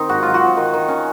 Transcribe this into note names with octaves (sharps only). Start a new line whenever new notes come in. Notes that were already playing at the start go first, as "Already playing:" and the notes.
Already playing: D#3 C4 D#4
G#2 F#4
F#3 F4
F#4
C4
D#3
D#3
C#4